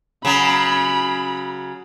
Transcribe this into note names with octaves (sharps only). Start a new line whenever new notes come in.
C#3 F#3 B5